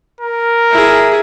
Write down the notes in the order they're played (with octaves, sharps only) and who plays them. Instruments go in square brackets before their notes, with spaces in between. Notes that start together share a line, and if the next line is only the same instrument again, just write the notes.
[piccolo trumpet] A#4
[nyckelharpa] E4 G#4